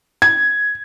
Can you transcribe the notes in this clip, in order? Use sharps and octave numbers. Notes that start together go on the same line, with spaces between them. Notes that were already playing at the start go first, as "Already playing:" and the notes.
G#6